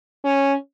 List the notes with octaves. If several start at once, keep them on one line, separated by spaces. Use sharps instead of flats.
C#4